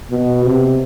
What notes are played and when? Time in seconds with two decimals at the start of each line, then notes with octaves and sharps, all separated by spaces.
0.11 B2
0.45 C3